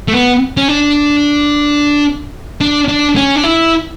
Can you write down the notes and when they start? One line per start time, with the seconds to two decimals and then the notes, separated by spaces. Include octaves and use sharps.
0.08 A3
0.13 B3
0.57 C#4
0.68 D4
2.61 D4
2.88 D4
3.16 C#4
3.36 D4
3.43 E4